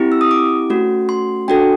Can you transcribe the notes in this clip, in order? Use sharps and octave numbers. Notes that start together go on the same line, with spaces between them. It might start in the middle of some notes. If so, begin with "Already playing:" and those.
Already playing: C4 E4 G4
E6
D#6
D6
A3 C#4 F#4
C6
D4 F#4 A4 G5